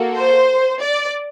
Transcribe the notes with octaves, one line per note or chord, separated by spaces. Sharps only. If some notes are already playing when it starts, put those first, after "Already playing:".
Already playing: A#3 F#4 A4
C5
D5